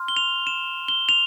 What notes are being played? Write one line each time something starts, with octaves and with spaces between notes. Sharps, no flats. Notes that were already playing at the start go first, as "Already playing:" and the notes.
Already playing: C6 F6
G7
F7
E7
G7
F7